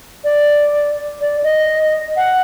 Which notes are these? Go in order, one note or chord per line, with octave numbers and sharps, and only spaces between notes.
D5
D5
D#5
F#5